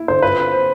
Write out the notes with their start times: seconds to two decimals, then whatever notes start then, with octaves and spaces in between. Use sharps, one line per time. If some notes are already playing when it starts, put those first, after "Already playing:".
Already playing: E4
0.08 D3 C5
0.22 F4 B4
0.38 C4
0.53 C5